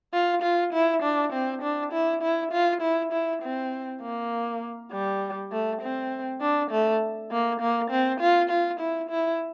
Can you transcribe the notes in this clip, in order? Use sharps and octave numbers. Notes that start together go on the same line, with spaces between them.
F4
F4
E4
D4
C4
D4
E4
E4
F4
E4
E4
C4
A#3
G3
A3
C4
D4
A3
A#3
A#3
C4
F4
F4
E4
E4